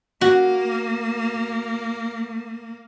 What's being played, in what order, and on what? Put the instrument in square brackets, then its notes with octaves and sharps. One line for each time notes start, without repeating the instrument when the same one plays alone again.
[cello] A#3 [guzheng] F#4